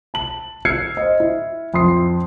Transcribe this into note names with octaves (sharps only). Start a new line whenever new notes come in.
A5 F#7
E6 F6 G#6 C7 C#7
C5 D#5
E4
F2 C6 D#6 C7